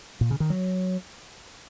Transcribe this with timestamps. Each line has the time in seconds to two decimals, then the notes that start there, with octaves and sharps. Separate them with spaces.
0.21 A#2
0.31 C#3
0.40 D#3
0.50 F#3